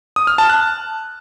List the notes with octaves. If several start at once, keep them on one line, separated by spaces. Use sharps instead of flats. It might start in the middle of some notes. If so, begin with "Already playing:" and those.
D#6
F6
A5
F#6